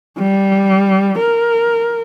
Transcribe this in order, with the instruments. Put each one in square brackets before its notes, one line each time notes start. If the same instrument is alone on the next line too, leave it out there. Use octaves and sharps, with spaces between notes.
[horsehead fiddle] G3
A#4